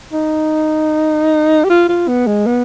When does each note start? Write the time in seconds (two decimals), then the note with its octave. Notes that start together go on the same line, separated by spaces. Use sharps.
0.13 D#4
1.65 G4
1.69 F4
1.89 F4
2.08 B3
2.27 G#3
2.47 B3